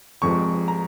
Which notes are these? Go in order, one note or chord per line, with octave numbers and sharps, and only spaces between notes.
F1 F2 F3 G#3 C#6
A#5